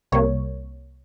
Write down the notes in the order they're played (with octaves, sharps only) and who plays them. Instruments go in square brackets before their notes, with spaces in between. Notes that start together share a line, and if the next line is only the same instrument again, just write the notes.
[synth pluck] C2 C3 G3 A#3 C#5